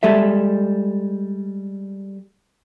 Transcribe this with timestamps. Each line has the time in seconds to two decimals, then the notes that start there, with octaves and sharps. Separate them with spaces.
0.03 G3 G#3 A4 E5